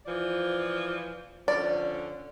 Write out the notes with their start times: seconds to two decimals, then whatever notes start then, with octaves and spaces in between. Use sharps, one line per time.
0.06 E3 F3 D5
1.48 D3 F3 C#4 D5